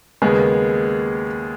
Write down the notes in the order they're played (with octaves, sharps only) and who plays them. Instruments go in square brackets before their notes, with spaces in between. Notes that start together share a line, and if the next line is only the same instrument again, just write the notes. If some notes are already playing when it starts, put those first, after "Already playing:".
[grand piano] D#2 C#3 G#3 B3